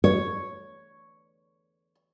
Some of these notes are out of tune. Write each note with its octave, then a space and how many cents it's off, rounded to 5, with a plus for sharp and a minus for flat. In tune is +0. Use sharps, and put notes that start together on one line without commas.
C#5 +0